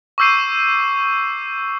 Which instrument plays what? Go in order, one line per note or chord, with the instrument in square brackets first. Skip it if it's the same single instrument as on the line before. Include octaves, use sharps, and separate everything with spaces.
[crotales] C#6 D6 E6 G6 C7 D#7